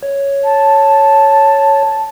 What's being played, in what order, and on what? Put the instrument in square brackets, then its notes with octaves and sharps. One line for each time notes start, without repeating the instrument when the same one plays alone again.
[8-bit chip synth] C#5
[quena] A5